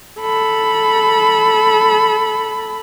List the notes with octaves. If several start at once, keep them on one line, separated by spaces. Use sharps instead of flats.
A4 B5